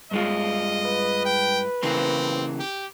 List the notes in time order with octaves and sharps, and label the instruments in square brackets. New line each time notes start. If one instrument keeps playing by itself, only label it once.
[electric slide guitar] G2 G#3 F4 [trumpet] D#5
[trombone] B4
[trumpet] G5
[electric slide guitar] C#3 E3 A#3 [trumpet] C4
[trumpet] G4